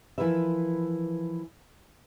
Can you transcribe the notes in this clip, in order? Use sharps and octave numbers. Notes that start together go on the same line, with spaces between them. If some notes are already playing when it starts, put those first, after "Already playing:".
E3 F3 E4 A#4 B4 E5